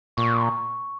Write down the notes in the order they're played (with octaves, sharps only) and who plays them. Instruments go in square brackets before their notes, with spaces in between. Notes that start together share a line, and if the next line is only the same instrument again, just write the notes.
[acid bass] A#2 [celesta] C#6